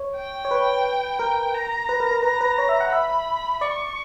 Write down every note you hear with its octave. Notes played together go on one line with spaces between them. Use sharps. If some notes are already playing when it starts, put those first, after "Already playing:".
Already playing: C#5
G5
C#5
B4
A#4
A#5
B4
A#4
A#4
B4 A#5
B4
C#5
E5
F#5
E5 B5
D5 C#6